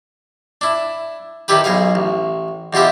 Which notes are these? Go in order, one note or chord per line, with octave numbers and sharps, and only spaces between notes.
D4 E4
D#3 D4 E4 G4 B4
B1 B2 G#4 F5
A1
E2 B2 F4 G4 E5